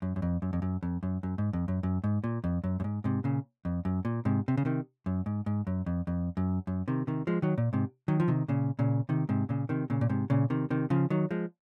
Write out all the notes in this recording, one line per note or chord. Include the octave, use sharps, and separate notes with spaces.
F#2
F#2
F2
F#2
F2
F#2
F2
F#2
F#2
G#2
F2
F#2
F#2
G#2
A#2
F2
F#2
F#2
G#2
G#2 C3
A#2 C#3
F2
F#2
A#2
G#2 C3
C3
C#3
C3 D#3
F#2
G#2
G#2
F#2
F2
F2
F#2
F#2
C3 D#3
C3 D#3
F3 G#3
D#3 F#3
A#2
G#2 C3
D#3 F#3
F3
C3 D#3
A#2 C#3
A#2 C#3
C3 D#3
G#2 C3
A#2 C#3
C3 D#3
A#2 C#3
A#2
G#2 C3
A#2 C#3
C3 D#3
C3 D#3
C#3 F3
D#3 F#3
F3 G#3